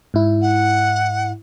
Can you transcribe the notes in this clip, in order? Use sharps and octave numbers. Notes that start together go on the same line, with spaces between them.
G#2 E4
F#5